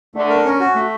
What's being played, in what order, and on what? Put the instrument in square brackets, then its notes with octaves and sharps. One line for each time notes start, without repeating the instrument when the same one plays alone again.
[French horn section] D3 [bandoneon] A3
[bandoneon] A#4
C#4
F#4
A3